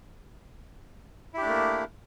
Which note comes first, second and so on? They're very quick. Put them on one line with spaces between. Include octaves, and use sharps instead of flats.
E4 G4 D4 A3 A#3